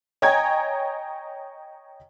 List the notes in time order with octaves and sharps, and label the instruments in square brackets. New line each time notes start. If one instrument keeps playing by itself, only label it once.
[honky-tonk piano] C#5 D#5 G5 G#5 A#5 G#6